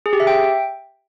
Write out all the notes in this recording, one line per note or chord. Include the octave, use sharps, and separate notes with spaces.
G#4
G4
E5
G5